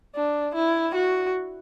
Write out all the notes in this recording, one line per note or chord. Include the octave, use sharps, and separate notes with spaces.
D4
E4
F#4